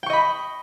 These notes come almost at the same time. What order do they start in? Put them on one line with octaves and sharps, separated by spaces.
G5 C#6 D#5 B5